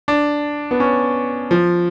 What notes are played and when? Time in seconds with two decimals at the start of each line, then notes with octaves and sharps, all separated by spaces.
0.08 D4
0.71 B3
0.80 C#4
1.51 F3